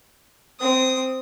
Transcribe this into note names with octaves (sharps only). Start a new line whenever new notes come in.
C4 D#6